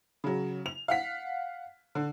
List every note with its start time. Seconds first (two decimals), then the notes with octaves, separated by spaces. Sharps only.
0.24 C#3 F#3
0.66 F7
0.88 F5 F#5 B6
1.95 D3